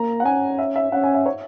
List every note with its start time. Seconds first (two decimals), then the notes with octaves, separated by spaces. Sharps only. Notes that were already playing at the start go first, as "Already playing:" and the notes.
Already playing: A#3 A#5
0.20 F#5
0.25 C#4 G#5
0.59 E5
0.76 E5
0.92 C#4 F#5
1.04 G#5
1.14 E5
1.26 C#5